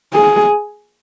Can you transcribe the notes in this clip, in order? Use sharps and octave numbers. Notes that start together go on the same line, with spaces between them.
G#4